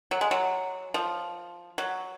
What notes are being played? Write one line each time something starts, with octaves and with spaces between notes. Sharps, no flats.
F#3
G#3
F#3
F3
F#3